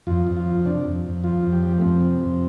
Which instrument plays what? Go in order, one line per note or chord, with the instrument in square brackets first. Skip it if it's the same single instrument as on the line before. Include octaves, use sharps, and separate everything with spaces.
[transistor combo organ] F2 F4
F2
F4
F3
C3 D4
F2
F2
F3 F4
F2
G4
F3
A3
F2 C4
C3
F2